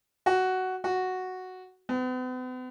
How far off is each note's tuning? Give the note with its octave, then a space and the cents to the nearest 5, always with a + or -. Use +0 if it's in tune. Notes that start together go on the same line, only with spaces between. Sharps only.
F#4 +10
F#4 +0
B3 +45